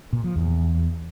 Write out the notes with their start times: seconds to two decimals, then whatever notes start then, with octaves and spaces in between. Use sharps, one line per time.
0.13 A#2
0.24 F3
0.36 E2